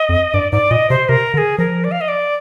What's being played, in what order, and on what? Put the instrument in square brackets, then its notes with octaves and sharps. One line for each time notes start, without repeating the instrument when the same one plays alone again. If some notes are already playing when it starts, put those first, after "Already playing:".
Already playing: [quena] D#5
[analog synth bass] F2
[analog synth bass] G2 [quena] D5
[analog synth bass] G#2 [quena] D5
[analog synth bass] A#2 [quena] D#5
[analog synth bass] C3 [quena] C5
[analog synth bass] C3 [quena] A#4
[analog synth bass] D3 [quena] A#4
[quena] G#4
[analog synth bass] F3 [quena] A#4
[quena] D5
F5
D#5
D5